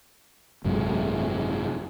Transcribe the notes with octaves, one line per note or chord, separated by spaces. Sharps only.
G#1 F#2 C3 G#3